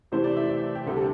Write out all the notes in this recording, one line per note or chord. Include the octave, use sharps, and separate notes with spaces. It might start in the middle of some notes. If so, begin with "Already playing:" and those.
C3 E3 A3 E4 C5
D5
E5
D5
G4
D2 C3 G3 A4
A4